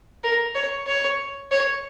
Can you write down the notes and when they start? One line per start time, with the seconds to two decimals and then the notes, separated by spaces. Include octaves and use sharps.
0.24 A#4
0.55 C#5
0.87 C#5
1.51 C#5